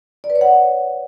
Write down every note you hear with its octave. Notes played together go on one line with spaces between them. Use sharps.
D5
B4
C#5
F#5